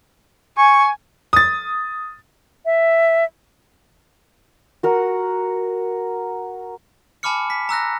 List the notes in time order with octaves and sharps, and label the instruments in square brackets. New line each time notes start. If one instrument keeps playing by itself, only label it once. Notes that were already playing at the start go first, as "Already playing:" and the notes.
[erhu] G#5 [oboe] C#6
[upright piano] D#6 A6
[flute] E5
[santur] F#4 A#4 F#5
[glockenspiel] G#5 A5 B5 D6 F6 C#7
B6
A#5 E6 F#6 A#6